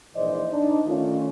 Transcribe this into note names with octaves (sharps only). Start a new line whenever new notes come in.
A#1 G#2 E3 C5 D5 D#5
D4 D#4
D#3 A3 C#4 F4